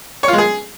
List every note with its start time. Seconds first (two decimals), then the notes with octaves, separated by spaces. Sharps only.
0.23 C#5
0.28 F4
0.33 G#3
0.38 G#4